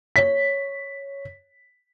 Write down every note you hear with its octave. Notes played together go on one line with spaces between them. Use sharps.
C#5 B6